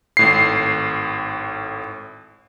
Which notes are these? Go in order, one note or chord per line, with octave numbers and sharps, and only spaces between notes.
G#1 A2 C7